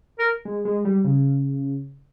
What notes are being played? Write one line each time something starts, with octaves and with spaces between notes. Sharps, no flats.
A#4
G#3
G#3
G3
C#3